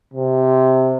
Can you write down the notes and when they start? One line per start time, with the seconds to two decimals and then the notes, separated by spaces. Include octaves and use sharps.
0.14 C3